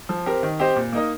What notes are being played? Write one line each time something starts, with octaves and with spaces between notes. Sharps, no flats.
F3
C4 G4 A#4
D#3
C4 G4 C5 D#5
A#2
A#3 D#4 A#4 D#5